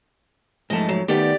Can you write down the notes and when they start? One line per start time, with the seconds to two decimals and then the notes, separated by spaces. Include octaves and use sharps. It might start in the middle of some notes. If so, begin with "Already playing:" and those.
0.70 G#2 F3 A3 D#5 A5
0.89 F#3
1.08 D#3 A3 B3 G4 D5